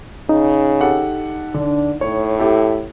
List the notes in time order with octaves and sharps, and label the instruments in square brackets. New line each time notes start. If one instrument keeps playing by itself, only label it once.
[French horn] C#3 [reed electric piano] D#4
[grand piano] G4 A4 F#5
[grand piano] D3 [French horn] D4
[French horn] A2 [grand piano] C#5
[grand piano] E4 G4 A4